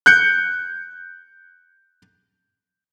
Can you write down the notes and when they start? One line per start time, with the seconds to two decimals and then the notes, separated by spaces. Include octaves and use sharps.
0.06 F#6 G6 C#7